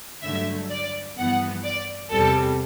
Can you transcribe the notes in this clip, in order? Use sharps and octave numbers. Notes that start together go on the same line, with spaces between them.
G2 D3 F#3 A3 E5
D5
G2 E3 B3 F#5
D5
E2 C3 G3 A4